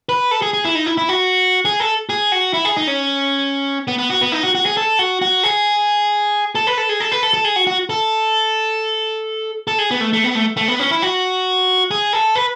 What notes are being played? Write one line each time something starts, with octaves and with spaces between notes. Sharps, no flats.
B4
A4
G#4
G#4
E4
D#4
E4
E4
F#4
G#4
A4
G#4
F#4
E4
G#4
D#4
C#4
B3
B3
F#4
B3
D#4
F#4
F#4
G#4
A4
F#4
F#4
G#4
A4
B4
A4
G#4
A4
B4
A4
A4
G#4
F#4
F#4
A4
A4
G#4
B3
A3
A3
B3
A3
A3
B3
C#4
E4
F#4
G#4
A4
B4